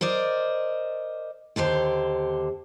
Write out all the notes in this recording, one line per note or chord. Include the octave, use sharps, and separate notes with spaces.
A#4 C5 D5 D#5
D#2 D3 G4 C5